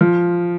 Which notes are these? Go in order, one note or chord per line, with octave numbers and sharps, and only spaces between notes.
F3